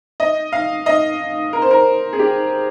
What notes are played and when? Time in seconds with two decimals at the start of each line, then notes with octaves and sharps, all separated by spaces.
0.20 D#5
0.52 F5
0.86 D#5
1.53 A#4
1.62 C5
1.71 A#4
2.13 G#4
2.19 G4